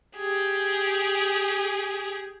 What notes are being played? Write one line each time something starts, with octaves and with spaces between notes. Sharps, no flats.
G4 G#4